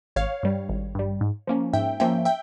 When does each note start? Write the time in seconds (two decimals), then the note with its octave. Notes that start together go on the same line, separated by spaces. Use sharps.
0.16 G#1 C#5 F5
0.43 G2 G3
0.69 G#1
0.95 G2 G3
1.21 G#2
1.47 F3 A#3 C#4
1.73 G#2 E5 G5
2.00 F3 A#3 C#4 E5 G5
2.25 E5 G5